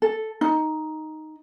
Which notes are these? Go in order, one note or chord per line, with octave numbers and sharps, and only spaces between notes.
A4
D#4